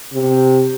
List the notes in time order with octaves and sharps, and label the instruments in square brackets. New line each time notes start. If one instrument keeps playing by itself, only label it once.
[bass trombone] C3